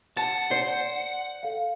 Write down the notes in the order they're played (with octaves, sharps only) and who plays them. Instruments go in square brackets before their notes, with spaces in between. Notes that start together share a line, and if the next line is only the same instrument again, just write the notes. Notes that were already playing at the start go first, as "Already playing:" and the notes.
[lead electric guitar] F#5 [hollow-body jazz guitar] A5
[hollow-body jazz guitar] C5 [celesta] D5
[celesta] A4 F5